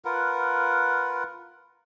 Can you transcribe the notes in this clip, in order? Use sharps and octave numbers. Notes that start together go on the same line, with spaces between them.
F4 A#4 B4 F#5